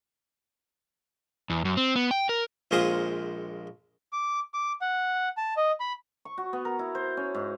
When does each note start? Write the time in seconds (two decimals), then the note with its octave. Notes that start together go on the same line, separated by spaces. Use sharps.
1.50 E2
1.65 F#2
1.77 C4
1.96 B3
2.11 G5
2.29 A#4
2.71 A#1 A#2 G#3 C5 F5 D#6
4.13 D6
4.54 D6
4.81 F#5
5.37 A5
5.57 D#5
5.80 B5
6.25 C#6
6.38 F#4
6.53 B3
6.65 A#4
6.79 E4
6.95 C5
7.17 C#4
7.35 G#2